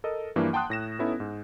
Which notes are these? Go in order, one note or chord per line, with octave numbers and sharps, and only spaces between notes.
A4 A#4 D#5
G2 E3 F3 A#3 D4 E4
F#5 G5 A5 C6 D#6 F#6
A2 A#6 E7
B3 C#4 D#4 E4 A4
G#2